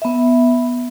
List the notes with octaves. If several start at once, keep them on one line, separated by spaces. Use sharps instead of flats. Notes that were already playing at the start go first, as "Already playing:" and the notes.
B3 E5